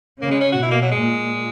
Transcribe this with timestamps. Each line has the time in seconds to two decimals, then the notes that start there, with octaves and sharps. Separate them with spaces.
0.22 C#3 A#3
0.31 G#3
0.41 C#4
0.52 F#4
0.62 B2 E4
0.71 A#3
0.82 F#3
0.91 G#3
1.01 A#2